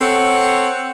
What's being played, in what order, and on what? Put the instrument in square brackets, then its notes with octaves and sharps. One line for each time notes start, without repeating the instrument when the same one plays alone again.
[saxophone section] C4 A4 C#5 F#5